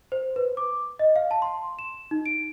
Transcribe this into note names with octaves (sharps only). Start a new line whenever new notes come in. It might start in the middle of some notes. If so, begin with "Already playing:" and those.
C5
B4
D6
D#5
F5
A5
C6
E7
D#4
D7